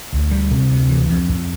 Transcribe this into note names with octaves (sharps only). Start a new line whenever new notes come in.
D2
G3
C3
D2
E3
F2
F2